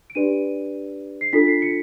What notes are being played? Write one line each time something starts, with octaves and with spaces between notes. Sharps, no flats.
D7
D4 G4 B4 D5 D#7
C7
D4 F4 A4 B6
C7
C#7